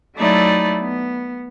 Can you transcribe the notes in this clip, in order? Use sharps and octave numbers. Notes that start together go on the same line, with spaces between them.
F#3 A3 D#4 E4 D5
B3